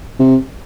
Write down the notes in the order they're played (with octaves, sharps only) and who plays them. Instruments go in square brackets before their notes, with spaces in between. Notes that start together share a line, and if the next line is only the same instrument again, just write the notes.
[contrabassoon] C3